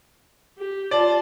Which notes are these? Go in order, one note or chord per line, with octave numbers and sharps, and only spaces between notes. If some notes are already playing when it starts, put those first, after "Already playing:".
G4
F4 D5 A5